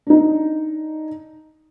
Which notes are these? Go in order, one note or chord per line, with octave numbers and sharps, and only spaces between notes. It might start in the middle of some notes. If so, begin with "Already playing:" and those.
D4 D#4